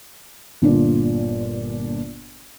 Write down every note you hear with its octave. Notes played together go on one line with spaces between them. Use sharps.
G1 A#2 D3 D4 F4 D5